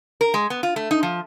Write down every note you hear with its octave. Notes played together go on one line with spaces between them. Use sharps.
A#4
G#3
B3
F4
A3
D#4
F3